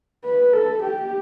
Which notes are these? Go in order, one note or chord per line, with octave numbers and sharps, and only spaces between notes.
B4
A4
G4